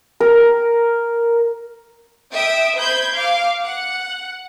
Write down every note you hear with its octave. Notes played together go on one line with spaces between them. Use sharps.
A#4
E5 G5 D#6 D7
C5 B5 G6 G#6
F5 D6
F#5